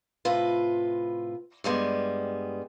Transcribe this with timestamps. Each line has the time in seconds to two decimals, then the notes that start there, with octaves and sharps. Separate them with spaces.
0.25 A2 C3 F4 B4
1.64 G2 G3 G#3 B3